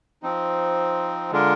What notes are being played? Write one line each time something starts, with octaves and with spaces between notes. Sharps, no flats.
F3 C4 D#4
D3 G#3 D4 F4 A#4